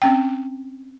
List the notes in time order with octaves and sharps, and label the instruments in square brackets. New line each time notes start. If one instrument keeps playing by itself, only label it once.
[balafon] C4 C#4 G5